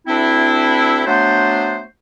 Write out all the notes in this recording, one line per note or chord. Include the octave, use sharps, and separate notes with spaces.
D2 C4 D4 E4
F#3 A3 B3 D4 C5